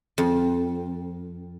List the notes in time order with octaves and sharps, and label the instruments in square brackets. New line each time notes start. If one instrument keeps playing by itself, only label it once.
[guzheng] F2